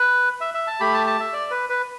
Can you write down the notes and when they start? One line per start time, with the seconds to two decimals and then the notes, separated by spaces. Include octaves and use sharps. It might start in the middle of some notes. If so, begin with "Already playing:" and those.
Already playing: B4
0.41 E5
0.54 E5
0.67 A5
0.80 A3 G4 B5
0.94 A5
1.07 A5
1.20 E5
1.33 D5
1.51 B4
1.69 B4